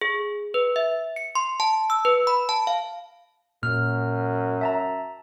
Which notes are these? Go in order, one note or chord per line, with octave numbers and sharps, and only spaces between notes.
G#4
B4
E5
C#7
C6
A5
E6
B4
B5
A5
F5
F#2 A#2 F6
E5 A5 A#5